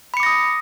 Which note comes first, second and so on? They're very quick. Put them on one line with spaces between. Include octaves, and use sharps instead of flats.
B5 C#7 D6 A#6 D#6